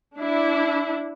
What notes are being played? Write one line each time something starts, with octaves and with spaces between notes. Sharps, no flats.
D4 E4